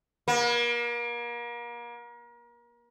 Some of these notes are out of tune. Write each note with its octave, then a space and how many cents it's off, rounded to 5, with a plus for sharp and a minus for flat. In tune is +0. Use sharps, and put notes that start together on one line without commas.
A#3 +35